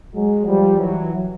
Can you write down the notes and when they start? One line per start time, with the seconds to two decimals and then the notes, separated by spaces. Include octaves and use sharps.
0.13 F#3 G#3
0.46 F3 G3
0.78 E3 F#3